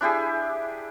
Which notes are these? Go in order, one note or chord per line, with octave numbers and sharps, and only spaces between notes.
D4 E4 G4 G#4